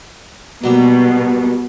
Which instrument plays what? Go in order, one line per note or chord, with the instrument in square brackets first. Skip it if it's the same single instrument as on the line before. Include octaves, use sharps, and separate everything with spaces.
[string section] B2 [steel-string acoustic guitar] F#3 G3 A#3